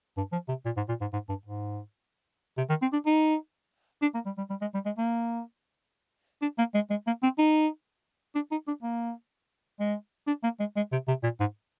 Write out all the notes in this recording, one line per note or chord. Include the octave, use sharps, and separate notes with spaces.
G2
F3
C3
A#2
G#2
A#2
G#2
G#2
G2
G#2
C3
D#3
C4
D4
D#4
D4
A#3
G3
G3
G3
G#3
G3
G#3
A#3
D4
A#3
G#3
G#3
A#3
C4
D#4
D4
D#4
D4
A#3
G#3
D4
A#3
G#3
G#3
C3
C3
A#2
G#2